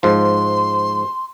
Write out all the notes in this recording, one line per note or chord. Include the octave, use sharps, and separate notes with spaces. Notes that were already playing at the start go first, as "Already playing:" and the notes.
G#2 F3 C6